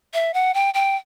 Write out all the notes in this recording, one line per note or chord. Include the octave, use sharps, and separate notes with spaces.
E5
F#5
G5
G5